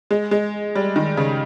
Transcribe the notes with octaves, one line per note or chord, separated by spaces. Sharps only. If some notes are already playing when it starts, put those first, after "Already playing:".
G#3
G#3
G3
D#3
C#3